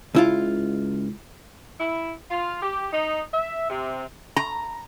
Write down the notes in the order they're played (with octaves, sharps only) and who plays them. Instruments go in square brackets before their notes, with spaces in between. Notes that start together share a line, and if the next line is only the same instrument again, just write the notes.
[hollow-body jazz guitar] C#2 E4 F4
[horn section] E4
F4
G4
D#4
E5
C3
[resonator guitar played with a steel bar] A#5